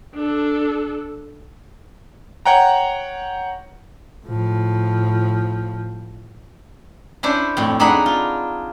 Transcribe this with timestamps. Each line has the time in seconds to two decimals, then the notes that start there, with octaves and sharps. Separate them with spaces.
0.15 D4 A4
2.45 C#5 F#5 G5 A#5
4.26 A2 F3
7.23 C#4 D4 E4 C5
7.57 F2 A2
7.80 D4 D#4 G#4 F#5 B5
8.06 F4